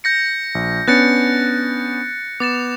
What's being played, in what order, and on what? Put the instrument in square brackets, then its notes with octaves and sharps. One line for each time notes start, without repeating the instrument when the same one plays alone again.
[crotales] G6 A#6 C#7
[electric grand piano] A#1
[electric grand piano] B3 C#4 D4 [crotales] F#6 A6 C#7
[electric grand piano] B3 [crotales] D6 A6 E7